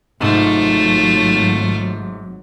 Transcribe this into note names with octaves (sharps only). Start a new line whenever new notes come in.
G#1 G#2 C3 F#3 A3 F4